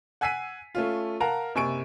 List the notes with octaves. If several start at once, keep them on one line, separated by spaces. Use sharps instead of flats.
F#5 G#5 E6 B6 C7 D#7
A3 C#4 F4
A#4 F5 F#5 A5 A#5
F#1 C3 G#5 C#6 D7